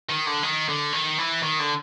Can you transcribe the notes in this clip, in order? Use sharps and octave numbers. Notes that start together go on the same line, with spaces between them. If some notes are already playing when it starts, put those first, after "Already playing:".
D#3
D3
D#3
D3
D#3
E3
D#3
D3